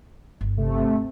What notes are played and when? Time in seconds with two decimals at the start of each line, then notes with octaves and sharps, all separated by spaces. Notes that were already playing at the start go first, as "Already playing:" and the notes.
0.41 G1
0.57 C3 A3